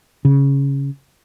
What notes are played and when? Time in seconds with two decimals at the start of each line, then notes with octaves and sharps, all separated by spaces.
0.25 C#3